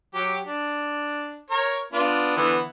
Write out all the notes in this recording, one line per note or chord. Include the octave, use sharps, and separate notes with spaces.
F#3 G4
D4
A#4 C#5
B3 D4 F4
D3 E3 B3